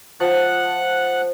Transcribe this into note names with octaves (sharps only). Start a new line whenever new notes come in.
F3 F#5 A5 F#6